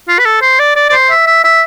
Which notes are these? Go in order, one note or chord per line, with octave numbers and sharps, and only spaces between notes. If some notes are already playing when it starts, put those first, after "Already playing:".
F4
B4
A4
C5
D5
D5
D5
C5
E5
E5
E5